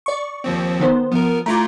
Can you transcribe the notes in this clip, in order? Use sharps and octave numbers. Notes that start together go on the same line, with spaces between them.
D5 C#6
D#2 F3 C4
D#3 B3 C5
F3 B3 A#4
A3 E4 F4 A#5 D6